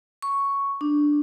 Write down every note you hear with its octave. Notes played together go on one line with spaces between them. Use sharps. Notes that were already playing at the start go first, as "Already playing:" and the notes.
C#6
D4